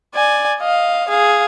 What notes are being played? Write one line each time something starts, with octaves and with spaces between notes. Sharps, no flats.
D5 G#5
D#5 F5
G#4 F5